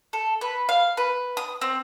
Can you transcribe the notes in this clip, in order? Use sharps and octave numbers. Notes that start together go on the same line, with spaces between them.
A4
B4
F5
B4
D#6
C4